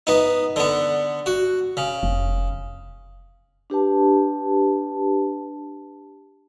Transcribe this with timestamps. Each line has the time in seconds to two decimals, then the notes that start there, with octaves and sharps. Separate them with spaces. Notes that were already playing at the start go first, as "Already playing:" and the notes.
0.07 B3 D#4
0.56 D3 B3
1.26 F#4
1.77 C#3
2.03 F1
3.70 D4 G4 B4 A5